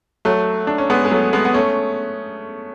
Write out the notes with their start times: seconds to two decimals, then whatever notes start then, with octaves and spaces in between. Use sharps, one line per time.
0.25 F#3 A3
0.67 D4
0.78 C#4
0.90 G#3 B3
1.05 G#3
1.11 F#3 A3
1.33 G#3 B3
1.45 B3
1.54 A3 C#4